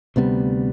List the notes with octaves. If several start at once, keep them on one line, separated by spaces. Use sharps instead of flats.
D2 C3 G3 B3